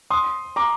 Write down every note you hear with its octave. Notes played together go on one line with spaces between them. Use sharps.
C6 D#6
A#5 D6